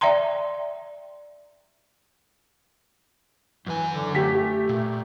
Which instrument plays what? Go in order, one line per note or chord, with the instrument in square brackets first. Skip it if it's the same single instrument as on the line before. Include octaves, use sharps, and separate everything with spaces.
[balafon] D5 E5 G5 A#5 C6
[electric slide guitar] F#2 G#5 [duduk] E3
[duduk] D3
[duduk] A3 [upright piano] G4 B6
[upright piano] G4
[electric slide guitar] A#2